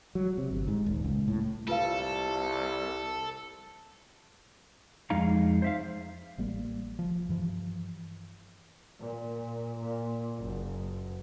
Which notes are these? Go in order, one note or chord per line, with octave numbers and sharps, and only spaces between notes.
F#3
C3
G1
G#2
D#1
C#2
A2
C2 F4 A4 B4 F5
F2 G#3 D#4 F5 A#5
C5 E5 F5
A1 G3 A#3
F3
G2 E3 F3
A#2
A#2
F#1